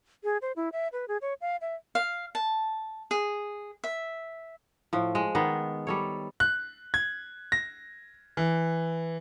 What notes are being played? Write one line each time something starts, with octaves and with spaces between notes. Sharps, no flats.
G#4
C5
E4
E5
B4
G#4
C#5
F5
E5
F5
A5
G#4
E5
A2 F3
G#3
D#3 B3
G3 A4 C#5
F#6
G#6
A#6
E3